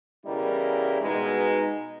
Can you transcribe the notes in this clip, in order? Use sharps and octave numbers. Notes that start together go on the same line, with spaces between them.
E2 C#3 G3 E4 A#4 D#5
B2 G#3 D#4